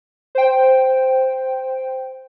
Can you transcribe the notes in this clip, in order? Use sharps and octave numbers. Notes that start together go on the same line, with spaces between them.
C5 G5